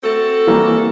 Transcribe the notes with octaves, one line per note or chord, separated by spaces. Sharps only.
C4 F#4 A4
E3 G3 A#3